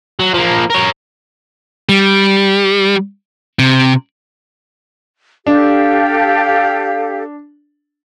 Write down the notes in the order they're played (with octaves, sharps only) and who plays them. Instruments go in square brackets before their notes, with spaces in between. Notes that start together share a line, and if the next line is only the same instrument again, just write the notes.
[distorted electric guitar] F#3
F3 A#3
A#4 C#5
[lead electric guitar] G3
C3
[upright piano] D4 [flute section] G4 A4 F5